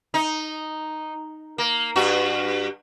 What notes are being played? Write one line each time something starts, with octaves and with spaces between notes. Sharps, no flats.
D#4
A#3
G2 F#4